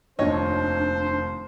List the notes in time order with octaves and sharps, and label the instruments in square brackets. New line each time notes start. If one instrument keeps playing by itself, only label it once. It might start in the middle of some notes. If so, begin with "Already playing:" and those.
[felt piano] F1 D#2 [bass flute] D4 [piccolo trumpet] C5 [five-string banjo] C#5 D#5